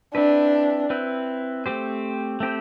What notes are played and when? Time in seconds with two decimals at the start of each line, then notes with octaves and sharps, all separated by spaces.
0.14 C4 D4 E4 B4
0.90 C4 E4 B4
1.66 A3 C4 G4 C5
2.40 A3 C4 G4 C5